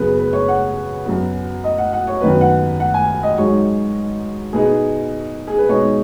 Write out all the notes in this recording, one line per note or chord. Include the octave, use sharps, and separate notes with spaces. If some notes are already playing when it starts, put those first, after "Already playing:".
Already playing: F#2 C#3 B3 B4
B4
C#5
F#5
F#2 F#3 B3
D#5
F#5
F#5
C#5
F#2 D#3 B3 B4
F#5
F#5
G#5
D#5
G#2 F#3 D#4 C#5
B2 B3 D#4 G#4
G#4
B4
B2 G#3 D#4 C#5